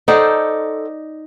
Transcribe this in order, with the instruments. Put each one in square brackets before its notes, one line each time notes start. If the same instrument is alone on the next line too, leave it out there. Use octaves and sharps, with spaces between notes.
[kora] D#4 D5 [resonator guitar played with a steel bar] A4 C5 F#5